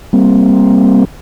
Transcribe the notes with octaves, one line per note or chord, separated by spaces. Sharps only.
G3 A#3 C4